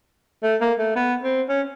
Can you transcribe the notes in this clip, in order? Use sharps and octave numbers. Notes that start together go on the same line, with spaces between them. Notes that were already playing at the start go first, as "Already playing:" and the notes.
A3
A#3
A3
B3
C4
C#4